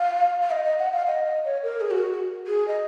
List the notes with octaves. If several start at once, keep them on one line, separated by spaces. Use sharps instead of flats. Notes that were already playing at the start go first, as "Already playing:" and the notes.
Already playing: F5
F5
D#5
D#5
F#5
F5
D#5
D#5
C#5
A#4
G#4
F#4
G#4
D#5